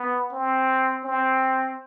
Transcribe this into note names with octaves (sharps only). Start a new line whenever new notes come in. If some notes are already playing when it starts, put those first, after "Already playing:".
Already playing: B3
C4
C4